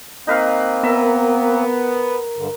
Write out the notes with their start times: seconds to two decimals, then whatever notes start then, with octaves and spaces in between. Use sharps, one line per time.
0.27 A#3 C4 D#4 B4 F5
0.83 B3 A#4 E5 A#5
2.37 G2 D3